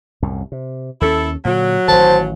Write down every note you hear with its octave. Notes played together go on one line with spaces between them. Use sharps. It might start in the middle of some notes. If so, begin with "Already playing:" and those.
C2 F#2 A2
C3
D#2 C#4 E4 A4
A#2 D3 F#3
A1 D#3 C5 A5